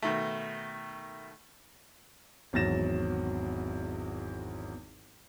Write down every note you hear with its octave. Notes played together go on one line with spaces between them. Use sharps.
B2 D#3 A3
G#1 E2 F#3 A6 A#6 E7